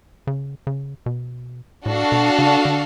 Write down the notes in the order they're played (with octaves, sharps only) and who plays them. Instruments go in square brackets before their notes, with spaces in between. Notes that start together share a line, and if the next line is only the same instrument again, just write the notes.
[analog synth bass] C#3
C#3
B2
[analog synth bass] A2 [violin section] D4 F#4 A4 F5
[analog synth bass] B2
C#3
D3